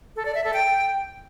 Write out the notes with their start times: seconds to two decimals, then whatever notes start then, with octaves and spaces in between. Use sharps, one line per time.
0.16 A4
0.25 D5
0.35 E5
0.44 A4
0.53 G5